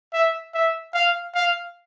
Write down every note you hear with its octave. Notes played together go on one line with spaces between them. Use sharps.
E5
E5
F5
F5